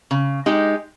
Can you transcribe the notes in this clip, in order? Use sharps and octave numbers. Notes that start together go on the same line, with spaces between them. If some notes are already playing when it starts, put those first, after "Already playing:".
C#3
G#3 D#4 G4